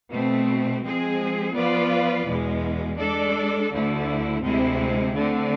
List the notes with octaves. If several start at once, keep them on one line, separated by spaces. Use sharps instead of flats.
B2 A3 C4
F3 G#3 C4 G#4
F3 B3 F4 B4 D5
E2 B2 G#3
G#3 D4 A4 D5
D2 D3 A3 E4
D2 C3 G#3 C4 E4
D3 A3 C4